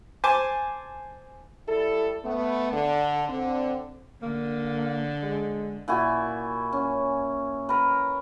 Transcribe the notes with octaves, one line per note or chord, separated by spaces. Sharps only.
C5 G#5 A5 D6
G3 E4 A4
A3 B3
D3
D3 C4
D3 A#3
G#3
A#2 E4 F#4 G#5
C#4
A#4 B4